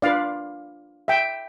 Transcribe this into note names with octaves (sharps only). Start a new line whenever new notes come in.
D4 F4 B4 D5 F5
E5 G5